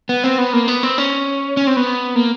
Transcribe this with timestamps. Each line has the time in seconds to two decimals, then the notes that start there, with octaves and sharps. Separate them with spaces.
0.09 B3
0.24 C4
0.38 B3
0.53 A#3
0.68 B3
0.83 C4
0.98 C#4
1.57 C#4
1.67 C4
1.77 B3
2.16 A#3